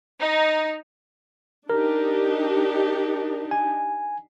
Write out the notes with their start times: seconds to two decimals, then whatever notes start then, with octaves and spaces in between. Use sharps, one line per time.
0.20 D#4
1.70 D4 D#4 G4 A#4
3.51 G#5